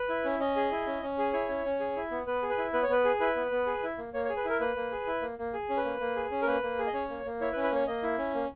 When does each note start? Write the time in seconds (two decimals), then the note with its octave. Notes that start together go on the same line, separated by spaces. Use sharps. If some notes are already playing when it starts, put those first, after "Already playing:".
Already playing: B4
0.09 E4
0.24 C#4
0.39 C#4 D#5
0.56 G#4
0.71 E4
0.86 C#4
1.02 C#4
1.18 G#4
1.33 E4 C#5
1.49 C#4
1.65 C#4
1.80 G#4
1.96 E4
2.11 B3
2.27 B3 B4
2.42 G#4
2.50 B4
2.58 E4
2.73 B3 B4
2.83 C#5
2.88 B3 B4
3.05 G#4
3.20 E4 B4
3.36 B3
3.51 B3
3.66 G#4
3.83 E4
3.97 A#3
4.13 A#3 C#5
4.25 C#5
4.29 G#4
4.37 B4
4.45 E4 A#4
4.60 A#3 B4
4.76 A#3
4.92 G#4
5.07 E4
5.22 A#3
5.38 A#3
5.54 G#4
5.69 C#4
5.77 B4
5.84 A#3
6.00 A#3
6.16 G#4
6.31 C#4
6.42 A#4
6.47 A#3 B4
6.63 A#3
6.79 G#4
6.87 D#5
6.93 C#4 C#5
7.09 A#3
7.25 A#3
7.41 E4 C#5
7.53 B4
7.56 C#4
7.63 B4
7.71 A#3 C#5
7.87 A#3 D#5
8.03 E4
8.18 C#4
8.34 A#3